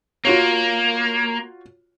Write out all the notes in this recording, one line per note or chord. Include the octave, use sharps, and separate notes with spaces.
A#3 F4 F#4 C#5